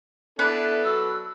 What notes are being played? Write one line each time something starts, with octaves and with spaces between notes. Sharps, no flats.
B3 D4 E4 A4 B4
F#3 E6